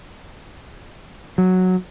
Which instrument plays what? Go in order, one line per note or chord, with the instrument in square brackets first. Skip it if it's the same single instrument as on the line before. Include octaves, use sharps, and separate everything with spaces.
[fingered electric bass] F#3